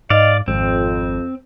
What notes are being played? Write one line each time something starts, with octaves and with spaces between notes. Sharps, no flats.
G#2 D5 D#5 F5
G#1 F2 C4